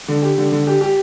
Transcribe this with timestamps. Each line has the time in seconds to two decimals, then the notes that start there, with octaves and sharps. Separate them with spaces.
0.08 D3
0.22 G4
0.38 D3
0.52 D3
0.67 G4
0.81 G4